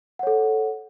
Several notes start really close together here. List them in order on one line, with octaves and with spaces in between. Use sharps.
F#5 C#5 A4